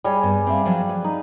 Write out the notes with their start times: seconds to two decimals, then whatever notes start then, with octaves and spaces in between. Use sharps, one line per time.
0.04 G3 G#4 C#5 D#5 G#5 A5
0.23 G2 B3
0.47 C4 D5 E5 F5
0.65 F3 F#3 D4
0.89 B4
1.04 D#4 B4